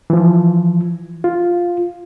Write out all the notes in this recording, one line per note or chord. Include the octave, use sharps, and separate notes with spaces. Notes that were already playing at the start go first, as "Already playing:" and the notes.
E3 F3
F4